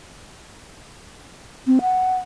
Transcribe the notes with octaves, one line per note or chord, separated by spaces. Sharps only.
C4
F#5